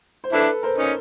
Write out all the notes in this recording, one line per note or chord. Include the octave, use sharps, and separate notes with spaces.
C5
D4 E4 A4 B4
A#4 C5
C#4 D#4